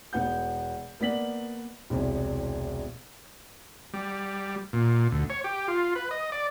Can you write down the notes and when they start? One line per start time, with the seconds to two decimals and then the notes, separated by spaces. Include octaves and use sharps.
0.13 E1 B3 F#5 G6
1.00 A#3 B3 D5 B6 F#7
1.90 E1 C2
3.94 G3
4.73 A#2
5.12 D2
5.30 C#5
5.44 G4
5.68 F4
5.96 B4
6.11 D#5
6.32 D5